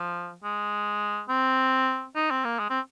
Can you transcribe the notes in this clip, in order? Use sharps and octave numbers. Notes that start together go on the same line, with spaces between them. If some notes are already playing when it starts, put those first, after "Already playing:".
Already playing: F3
G#3
C4
D#4
C4
A#3
G#3
C4